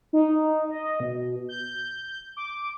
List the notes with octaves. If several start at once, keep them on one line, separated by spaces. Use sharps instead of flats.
D#4
D#5
B2
G6
D6